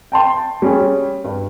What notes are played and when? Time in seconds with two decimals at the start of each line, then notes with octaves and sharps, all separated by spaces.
0.12 G5 A5 C6
0.62 G3 C#4 G#4
1.24 G2